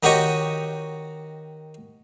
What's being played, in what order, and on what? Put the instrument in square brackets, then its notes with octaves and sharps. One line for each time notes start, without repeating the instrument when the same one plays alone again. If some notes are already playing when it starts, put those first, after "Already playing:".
[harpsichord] D#3 D#4 F#4 G4 C#5 D#5